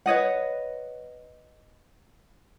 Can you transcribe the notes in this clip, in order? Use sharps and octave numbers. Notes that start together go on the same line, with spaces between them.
B4 C#5 D#5 F#5